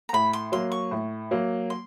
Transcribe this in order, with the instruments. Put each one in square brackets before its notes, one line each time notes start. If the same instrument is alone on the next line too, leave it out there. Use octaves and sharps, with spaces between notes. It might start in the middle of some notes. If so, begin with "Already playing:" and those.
[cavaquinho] A#5
[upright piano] A2 [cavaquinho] B5
[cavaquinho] C6
[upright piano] F#3 A#3 [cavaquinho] C6
[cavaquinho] C#6
[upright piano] A2
F#3 A#3
[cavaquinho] C6